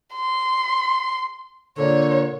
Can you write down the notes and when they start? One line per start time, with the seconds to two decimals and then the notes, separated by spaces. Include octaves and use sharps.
0.15 C6
1.78 A#2 D3 C#5